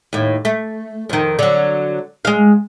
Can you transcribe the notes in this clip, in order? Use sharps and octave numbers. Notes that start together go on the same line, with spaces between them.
D#2 A2
A3
F2 D#3
D3 F#3
G#3 F5